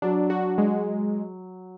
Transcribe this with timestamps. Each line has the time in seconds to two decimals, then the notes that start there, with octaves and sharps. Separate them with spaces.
0.02 F#3 D4
0.30 F#4
0.58 G#3